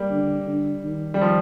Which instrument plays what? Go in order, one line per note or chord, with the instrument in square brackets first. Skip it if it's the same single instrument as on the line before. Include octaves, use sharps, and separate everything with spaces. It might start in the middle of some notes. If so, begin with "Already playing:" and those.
Already playing: [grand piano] G3 A#3
[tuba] D3
D3
D#3
[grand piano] G3
F3